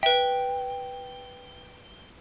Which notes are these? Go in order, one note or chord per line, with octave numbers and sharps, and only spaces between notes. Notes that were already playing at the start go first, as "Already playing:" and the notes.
B4 E5 G5